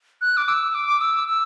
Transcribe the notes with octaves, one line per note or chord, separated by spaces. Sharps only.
F#6
D6
E6
D6
E6
E6